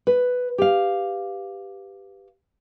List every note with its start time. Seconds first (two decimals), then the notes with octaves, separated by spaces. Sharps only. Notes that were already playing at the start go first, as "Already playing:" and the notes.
0.07 B4
0.58 G4 F5